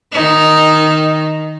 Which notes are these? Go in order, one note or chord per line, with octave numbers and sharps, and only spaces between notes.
D#3 D#4